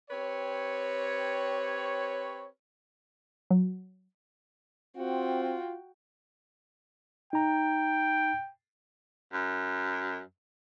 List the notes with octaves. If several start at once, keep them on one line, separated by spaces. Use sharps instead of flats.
C4 G4 B4 C#5
F#3
C4 F4 F#4 G5
D#4 G5 A#5
F#2